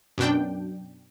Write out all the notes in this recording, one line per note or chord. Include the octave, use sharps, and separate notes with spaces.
F#2 B2 D4 G5